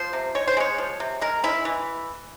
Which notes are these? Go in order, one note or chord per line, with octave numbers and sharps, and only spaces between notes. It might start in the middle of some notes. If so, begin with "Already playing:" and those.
Already playing: F3 C5
C3
G#3 C#5
C5
G#3 C#5
F3
C3
G#3 A#4
G#3 E4
E3